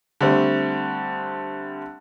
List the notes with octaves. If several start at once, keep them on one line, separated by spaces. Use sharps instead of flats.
D3 G3 A3 C4